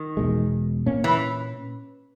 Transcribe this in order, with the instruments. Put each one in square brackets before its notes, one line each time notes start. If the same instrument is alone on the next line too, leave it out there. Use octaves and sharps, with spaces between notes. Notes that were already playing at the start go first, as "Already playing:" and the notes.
Already playing: [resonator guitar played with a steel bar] D#3
[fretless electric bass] E2 B2 G#3
A#2 A#3 C#4
[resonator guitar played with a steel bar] E3